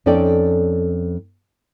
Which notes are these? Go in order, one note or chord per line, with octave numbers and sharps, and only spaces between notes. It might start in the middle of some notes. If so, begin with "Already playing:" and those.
F2 C#4 D#4 A4 D5 G5